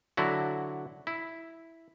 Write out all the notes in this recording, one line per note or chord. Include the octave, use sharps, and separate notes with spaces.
D3 F#3 E4 F#4
E4